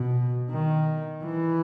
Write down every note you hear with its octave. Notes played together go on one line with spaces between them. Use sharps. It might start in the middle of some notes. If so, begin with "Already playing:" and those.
Already playing: B2
D#3
E3